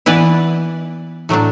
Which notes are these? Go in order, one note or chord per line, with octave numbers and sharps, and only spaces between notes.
E3 B3 E4 B4 D5
A2 F#3 A3 D4